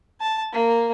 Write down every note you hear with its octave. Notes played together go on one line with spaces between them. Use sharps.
A5
A#3